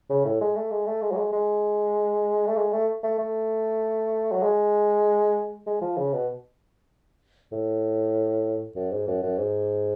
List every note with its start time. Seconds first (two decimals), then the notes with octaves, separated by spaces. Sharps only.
0.10 C#3
0.25 A2
0.41 G#3
0.56 A3
0.71 G#3
0.87 A3
1.02 G#3
1.11 F#3
1.18 G#3
1.33 G#3
2.47 A3
2.57 G#3
2.73 A3
3.03 A3
3.19 A3
4.32 F#3
4.43 G#3
5.66 G#3
5.81 F3
5.97 C#3
6.13 B2
7.52 A2
8.76 F#2
8.91 G#2
9.07 F#2
9.23 F#2
9.38 G#2